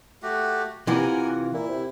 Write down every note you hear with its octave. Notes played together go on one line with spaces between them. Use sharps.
A3 F#4 G4
C3 E3 F4 A#4 F#5 G#5
A#2 E4
C3